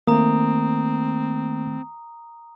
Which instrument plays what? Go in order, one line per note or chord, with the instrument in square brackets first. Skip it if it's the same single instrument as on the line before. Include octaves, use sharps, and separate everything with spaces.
[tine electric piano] D#3 A3 [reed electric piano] A#3 [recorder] C4 [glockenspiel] A#5 D#6